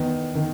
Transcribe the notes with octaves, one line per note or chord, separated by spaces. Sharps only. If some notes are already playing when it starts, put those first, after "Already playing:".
Already playing: E2 D#3 B3
D#3